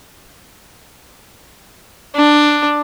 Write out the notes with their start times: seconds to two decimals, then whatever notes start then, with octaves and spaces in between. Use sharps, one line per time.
2.16 D4